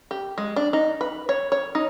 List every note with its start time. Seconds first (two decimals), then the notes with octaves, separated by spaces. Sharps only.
0.11 G4
0.38 G#3
0.56 D4
0.73 D#4
1.01 B4
1.29 C#5
1.52 C#5
1.75 D#4